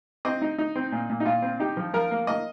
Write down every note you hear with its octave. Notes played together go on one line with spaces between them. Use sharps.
C4 D#5
D#4
D#4
C4
A#2
A#2
D#4
A#2 F4
C4
D#4 G4
F3
F3 A#4
A#3
A#3 D#5